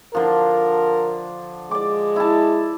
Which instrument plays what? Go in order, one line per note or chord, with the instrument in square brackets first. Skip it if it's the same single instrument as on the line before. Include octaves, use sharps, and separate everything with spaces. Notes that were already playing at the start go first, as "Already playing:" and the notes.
[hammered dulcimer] D3 F3 [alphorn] A#4
[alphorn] G#3 [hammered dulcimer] D5 D6
[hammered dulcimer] E4 A5